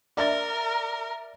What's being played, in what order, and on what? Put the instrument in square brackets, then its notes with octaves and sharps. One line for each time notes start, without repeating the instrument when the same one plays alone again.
[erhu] A#4 [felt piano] D5 E5 A6